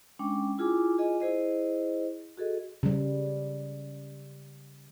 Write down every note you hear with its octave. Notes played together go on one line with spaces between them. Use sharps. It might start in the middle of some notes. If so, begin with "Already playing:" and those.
G#3 C#4 D4 G5 D6
E4 F4 G#4 G#5 D6
F4 G#4 D#5 G#5
E4 G#4 C5 D#5
F#4 G#4 A4 D#5
C#3 G3